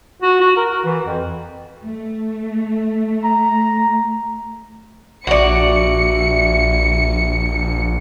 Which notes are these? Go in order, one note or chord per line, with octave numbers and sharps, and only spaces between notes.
F#4
F#4
A#4
F#4
E3
F2
A3
A#5
A#1 F#4 D5 E5 C#7